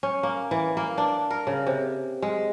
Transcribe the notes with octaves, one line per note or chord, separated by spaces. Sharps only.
C#4
A#3
E3
A#3
D4
A#4
C#3
C3
G#3